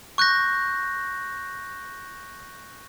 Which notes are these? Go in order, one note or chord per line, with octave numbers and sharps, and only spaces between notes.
C#6 F#6 G6 A#6